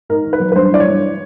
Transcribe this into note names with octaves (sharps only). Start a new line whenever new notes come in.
G#2 A#4
D#3
B4
F#3
B4
G2 C5
E3 D5
C#5
G2